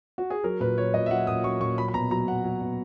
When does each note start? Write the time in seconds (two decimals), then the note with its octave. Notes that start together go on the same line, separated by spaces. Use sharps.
0.18 F#4
0.30 G#4
0.44 F#3 A#4
0.60 A#2 B4
0.78 F#3 C#5
0.94 A#2 D#5
1.06 E5
1.11 F#3 F#5
1.27 A#2 D#6
1.44 F#3 C#6
1.61 A#2 C#6
1.78 F#3 B5
1.88 B5
1.94 B2 A#5
2.11 F#3 A#5
2.28 B2 F#5
2.44 F#3
2.61 B2